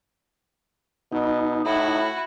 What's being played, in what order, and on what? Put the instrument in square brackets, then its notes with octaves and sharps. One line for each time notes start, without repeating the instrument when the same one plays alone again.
[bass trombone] B2 [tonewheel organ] D#4
[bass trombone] A2 [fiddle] E4 F#4